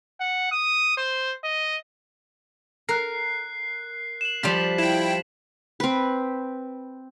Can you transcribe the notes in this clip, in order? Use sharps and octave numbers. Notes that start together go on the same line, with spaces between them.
F#5
D#6
C5
D#5
A#4 F#6 C7
E7 F#7
F3 G3 F4 B6
E4 G5 E7
C4 B4